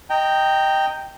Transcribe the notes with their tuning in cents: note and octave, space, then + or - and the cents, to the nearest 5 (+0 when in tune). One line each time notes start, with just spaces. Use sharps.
D#5 +0 G5 +0 A#5 -25